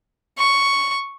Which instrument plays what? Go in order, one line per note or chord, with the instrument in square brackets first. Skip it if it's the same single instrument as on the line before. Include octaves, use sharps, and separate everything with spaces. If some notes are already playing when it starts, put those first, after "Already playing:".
[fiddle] C#6